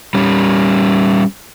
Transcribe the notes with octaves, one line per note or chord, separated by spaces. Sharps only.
G3 C#4